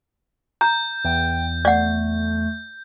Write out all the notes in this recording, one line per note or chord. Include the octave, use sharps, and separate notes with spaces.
A#5 G6
E2 G5
A3 D5 F#5